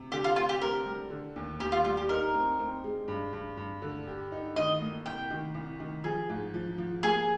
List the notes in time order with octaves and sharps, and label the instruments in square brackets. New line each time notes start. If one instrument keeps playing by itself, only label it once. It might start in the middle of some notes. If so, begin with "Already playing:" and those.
Already playing: [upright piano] C3
[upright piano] D3 [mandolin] G4
[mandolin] F4
[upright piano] C4 [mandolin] F4
[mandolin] G4
[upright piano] C4 [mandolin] A#4
[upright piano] G3
D3
D#2
[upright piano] D#2 [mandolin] G4
[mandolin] F4
[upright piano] G3 [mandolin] F4
[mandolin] G4
[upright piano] D#4 [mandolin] A#4
[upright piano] C4
C4
G#3
G2
G2
G2
D3
G4
D#4
[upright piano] D#3 [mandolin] D#5
[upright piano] A#3
[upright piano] C2 [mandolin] G5
[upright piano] D#3
C2
D#3
[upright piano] F3 [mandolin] G#4
[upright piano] G#2
F3
F3
[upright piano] A#3 [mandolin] G#4